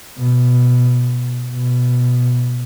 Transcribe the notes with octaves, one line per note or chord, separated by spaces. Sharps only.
B2
B2